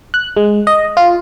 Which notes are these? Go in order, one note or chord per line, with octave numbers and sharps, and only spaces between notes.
F#6
G#3
D#5
F4